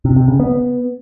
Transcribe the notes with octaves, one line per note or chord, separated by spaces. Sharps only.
C3
C3
C#3
B3